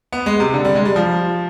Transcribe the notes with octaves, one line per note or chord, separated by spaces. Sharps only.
B3
G#3
C3
D3
G3
G#3
G3
F3